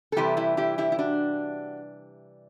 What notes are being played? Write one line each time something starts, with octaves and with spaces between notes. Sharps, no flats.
A4
C3 E3 G3 E4 G4
E4 G4
E4 G4
E4 G4
E4
D4 F#4